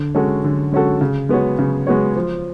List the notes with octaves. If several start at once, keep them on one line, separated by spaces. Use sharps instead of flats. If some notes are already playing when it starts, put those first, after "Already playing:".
Already playing: D3
G#3 C#4 F#4 A4
D3
G#3 C#4 F#4 A4
C#3
G#3 B3 F#4 C#5
C#3
G#3 B3 F#4 C#5
F3